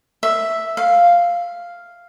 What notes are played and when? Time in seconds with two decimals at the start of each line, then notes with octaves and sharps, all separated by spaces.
0.23 E5
0.77 F5